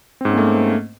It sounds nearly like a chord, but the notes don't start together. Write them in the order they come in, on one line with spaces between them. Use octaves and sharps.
C4 G#2 C#4 A#3 A3